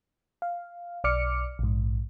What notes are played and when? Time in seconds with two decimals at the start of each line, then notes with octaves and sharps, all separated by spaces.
0.42 F5
1.04 B1 D5 D6 F6 C#7
1.59 A#1 G#2